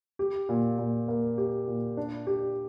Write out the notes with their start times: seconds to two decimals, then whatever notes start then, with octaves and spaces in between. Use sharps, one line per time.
0.19 G4
0.49 A#2
0.79 A#2
1.08 A#3
1.38 G4
1.67 A#2
1.97 D4
2.27 G4